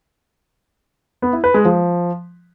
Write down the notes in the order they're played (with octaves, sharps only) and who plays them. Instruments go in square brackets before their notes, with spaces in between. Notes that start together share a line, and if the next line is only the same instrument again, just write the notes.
[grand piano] B3
E4
B4
G#3
F3